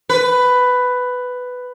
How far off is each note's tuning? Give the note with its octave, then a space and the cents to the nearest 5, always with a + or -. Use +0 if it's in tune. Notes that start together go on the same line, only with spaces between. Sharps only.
B4 +10